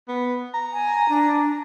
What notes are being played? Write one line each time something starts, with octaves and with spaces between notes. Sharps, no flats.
B3
A#5
G#5
D4